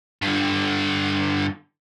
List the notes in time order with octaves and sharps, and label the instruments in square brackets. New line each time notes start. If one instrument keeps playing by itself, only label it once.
[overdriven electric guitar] G2 D3